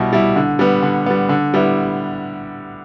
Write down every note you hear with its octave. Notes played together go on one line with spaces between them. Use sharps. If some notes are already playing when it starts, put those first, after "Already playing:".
Already playing: B2 G3 E4
G3 E4
D3
G3 B3
D3
G3 B3
D3
G3 B3 E4